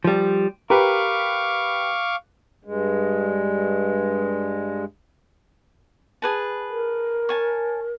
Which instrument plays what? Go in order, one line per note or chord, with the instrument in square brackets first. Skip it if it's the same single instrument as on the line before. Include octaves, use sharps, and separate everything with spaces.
[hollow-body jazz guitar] F3 G3
[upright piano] G4 B4 [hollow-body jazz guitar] A#4 [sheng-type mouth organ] F5 C#6 D6
[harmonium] G2 G#3
[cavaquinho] G#4 B4 A5
[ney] A#4
[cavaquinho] C#5 G#5 A5